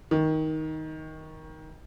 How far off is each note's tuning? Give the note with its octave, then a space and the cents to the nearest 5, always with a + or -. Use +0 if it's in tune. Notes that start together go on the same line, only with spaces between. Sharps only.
D#3 +15